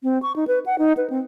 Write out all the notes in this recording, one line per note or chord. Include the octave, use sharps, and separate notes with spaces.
C4
C#6
D#4
B4
F#5
D#4
B4
C4